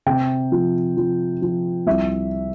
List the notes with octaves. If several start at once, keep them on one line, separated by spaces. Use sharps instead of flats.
C3 G5
F3
F3
F3
C2 E5